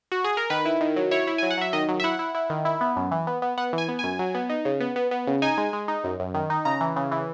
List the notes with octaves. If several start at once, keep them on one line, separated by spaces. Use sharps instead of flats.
F#4
G#4
A#4
D#3 B4
E4
D#3
F#3
E4 C#5
E4
F#3 G#5
F#5
F#3 E5
D#3 D#5
F#3
E5
E4 F#5
E4
E4
D#3
E4
B3
F#2
E3
B3
B3
B3 F#5
E3
G#5
B3
F#2 G#5
F#3
B3
D#4
C#3
B3
B3
B3
C#3
D#4 G#5
G#3
G#3
D#4
F#2
F#2
D#3
D#4
C#3 A#5
E3
C#3
E3